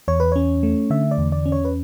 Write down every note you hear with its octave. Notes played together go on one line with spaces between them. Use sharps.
E2 C#5
B4
C#4 C#5
A3
D3 E5
D5
E2
D5
C#4
C#5
B4